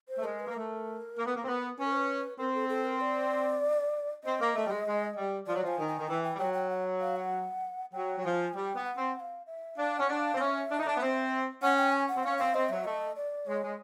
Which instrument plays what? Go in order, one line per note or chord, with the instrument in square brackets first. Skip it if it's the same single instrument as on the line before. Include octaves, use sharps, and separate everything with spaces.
[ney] C5
[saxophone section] A3
[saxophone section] G#3 [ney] A#4
[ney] B4
[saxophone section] A#3
[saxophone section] A3 [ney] A#4
[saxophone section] A#3
B3
A#3
C4
B3
[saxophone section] C#4 [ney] B4
[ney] A#4
C5
B4
[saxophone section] C4 [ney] A#4
[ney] A4
A4
A#4
D5
[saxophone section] C4 [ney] D#5
[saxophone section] A#3
A3
G3
G#3
G#3
G3
[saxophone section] F3 [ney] D5
[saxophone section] F#3
[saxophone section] F3 [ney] G#5
[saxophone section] D#3
[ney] G#5
[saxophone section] D#3
[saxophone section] E3 [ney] G5
[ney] G5
[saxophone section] G3
[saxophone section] F#3 [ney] G5
[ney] G5
F#5
F5
F#5
[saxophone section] F#3 [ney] G5
[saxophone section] F#3
[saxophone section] F3 [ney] G#5
[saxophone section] G3 [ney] G5
[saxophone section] B3
[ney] F#5
[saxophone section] C4
[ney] F#5
F5
E5
[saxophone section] D4 [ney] F5
[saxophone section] C#4 [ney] F#5
[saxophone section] D4
[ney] F5
[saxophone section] C4
[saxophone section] C#4 [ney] F5
[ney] E5
[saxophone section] D4
D#4
D4
B3
C4
[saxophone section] C#4 [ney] F#5
[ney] G5
G#5
F#5
[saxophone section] C4
[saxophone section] C#4 [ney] F5
[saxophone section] C4 [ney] F5
[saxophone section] C4 [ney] D#5
[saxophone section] F#3 [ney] E5
[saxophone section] A3 [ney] D#5
[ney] D5
[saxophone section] G#3 [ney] C#5
[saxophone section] G#3